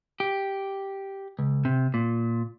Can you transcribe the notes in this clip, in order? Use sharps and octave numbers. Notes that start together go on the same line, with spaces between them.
G4
C#2
C3
A#2